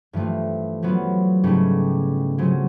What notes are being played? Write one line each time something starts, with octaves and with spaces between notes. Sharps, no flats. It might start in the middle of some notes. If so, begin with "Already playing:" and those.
G2 E3 F3 A3
F3 F#3 B3
G#2 C#3 G3 A3 C#4 E4
C#3 F3 F#3 C4 C#4